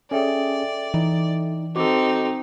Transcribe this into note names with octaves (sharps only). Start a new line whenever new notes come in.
C#4 G#4 A4 D5 E5 G5
E3 D#4
C4 D#4 F#4 A4 D6